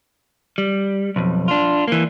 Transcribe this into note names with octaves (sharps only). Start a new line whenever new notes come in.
G3
B1 F2
D4 F4
E3 A#3